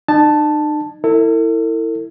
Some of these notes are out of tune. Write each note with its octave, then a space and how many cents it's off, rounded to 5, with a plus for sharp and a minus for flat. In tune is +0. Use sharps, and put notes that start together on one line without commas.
D#4 -45 A5 +0
E4 -10 A4 +45